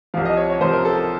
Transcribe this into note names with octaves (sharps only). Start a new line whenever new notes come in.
C2 C3 F3 F5
D#5
C#5
C#5
C2 C3 F3 C5
A#4
A4